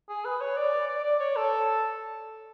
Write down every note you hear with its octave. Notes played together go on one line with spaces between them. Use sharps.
G#4
B4
C#5
D5
D5
D5
C#5
A4